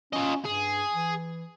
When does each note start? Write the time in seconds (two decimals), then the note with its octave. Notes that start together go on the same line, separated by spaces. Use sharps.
0.13 C#4 F4 D#5
0.45 G2 G#4
0.94 E3